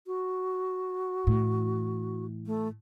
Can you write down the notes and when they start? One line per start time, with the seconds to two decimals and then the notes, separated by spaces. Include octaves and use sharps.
0.07 F#4
1.27 A2 E3
2.46 A3